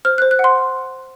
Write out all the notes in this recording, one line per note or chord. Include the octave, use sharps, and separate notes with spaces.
C5 F6
C5 F#6
F#6
F#5
C6